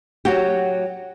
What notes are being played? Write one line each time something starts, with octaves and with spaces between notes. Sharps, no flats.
F#3 F#4 G4